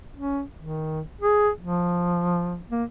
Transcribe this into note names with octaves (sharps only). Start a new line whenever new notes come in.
C#4
D#3
G#4
F3
A#3